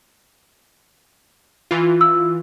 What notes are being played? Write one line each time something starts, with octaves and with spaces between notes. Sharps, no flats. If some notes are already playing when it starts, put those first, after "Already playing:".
E3 F4
E6